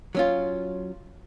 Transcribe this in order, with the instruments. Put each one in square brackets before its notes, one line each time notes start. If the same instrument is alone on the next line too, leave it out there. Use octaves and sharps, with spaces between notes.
[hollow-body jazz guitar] F#3 C#4 F4